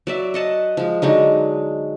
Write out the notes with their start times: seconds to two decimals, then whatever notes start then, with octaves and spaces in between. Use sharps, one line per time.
0.07 F#3 D5 E5
0.34 D#5 F#5 A5
0.77 F3 G#3
1.02 D3 F#3 G#3 D#4